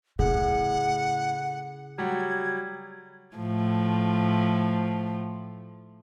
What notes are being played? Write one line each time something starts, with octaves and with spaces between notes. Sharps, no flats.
A2 C#3 G#4 F#5
F#3 G3 F#5 G#6
A2 F3 A3